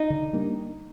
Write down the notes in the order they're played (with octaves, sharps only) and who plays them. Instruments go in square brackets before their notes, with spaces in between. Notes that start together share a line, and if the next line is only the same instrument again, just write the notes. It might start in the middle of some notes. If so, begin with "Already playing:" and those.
Already playing: [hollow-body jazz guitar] D#4
[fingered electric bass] D3
G3 A#3 D4